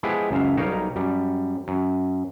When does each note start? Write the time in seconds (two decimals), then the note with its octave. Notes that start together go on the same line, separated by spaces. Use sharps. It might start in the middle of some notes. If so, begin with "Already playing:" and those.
0.03 F3 G#3 B3 E4 G4 G#4
0.31 C#2 F#2 E5 F5
0.57 B1 G3 D#4 A#4 C#5 F5
0.96 F#2 G3
1.68 F#2